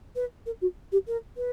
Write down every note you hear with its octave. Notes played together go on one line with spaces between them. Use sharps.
B4
A#4
F#4
G4
A#4
B4